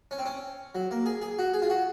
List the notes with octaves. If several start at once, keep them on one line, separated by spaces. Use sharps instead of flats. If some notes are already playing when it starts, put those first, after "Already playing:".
C#4
C4
C#4
F#3
A#3
G#4
G#4
F#4
G#4
F4
F#4